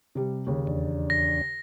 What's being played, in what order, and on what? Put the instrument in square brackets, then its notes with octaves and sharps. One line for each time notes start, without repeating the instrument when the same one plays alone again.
[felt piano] C3 G3
D#2 C#3
[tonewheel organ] E2 D4
[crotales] A#6